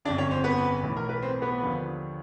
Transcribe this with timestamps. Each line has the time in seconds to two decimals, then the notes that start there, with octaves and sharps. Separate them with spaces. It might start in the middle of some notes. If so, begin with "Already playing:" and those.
0.05 G1 F2 C#3 D4 D5
0.18 C#4 C#5
0.31 C4 C5
0.44 B3 B4
0.83 B1 A2 E3
0.97 A#4
1.09 B4
1.22 C4 C5
1.42 B3 B4
1.61 D#2 D3 F3